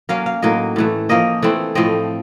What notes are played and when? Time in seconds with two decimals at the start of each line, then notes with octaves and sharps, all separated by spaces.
0.09 F#3 A#3 C#4 F5
0.26 F5
0.42 A2 F#3 A#3 D#4 D#5
0.76 A2 E3 A3
1.09 F3 A#3 C#4 D#5
1.42 E3 A3 C4 E4
1.75 A2 F3 A3 C4 D#5